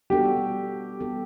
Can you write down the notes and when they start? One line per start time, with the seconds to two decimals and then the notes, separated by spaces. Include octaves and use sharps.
0.10 G3 B3 D4 F#4 G4 A4
1.00 G3 B3 D4 F#4 A4